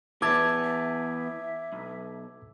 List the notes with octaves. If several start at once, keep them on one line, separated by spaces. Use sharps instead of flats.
E3 B3 E5 A5 D6 E6 G#6
E5
B1